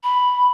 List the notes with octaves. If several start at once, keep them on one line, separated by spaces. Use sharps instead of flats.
B5